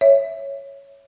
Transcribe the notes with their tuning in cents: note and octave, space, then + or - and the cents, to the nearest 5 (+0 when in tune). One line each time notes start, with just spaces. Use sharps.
C#5 +0 E5 +0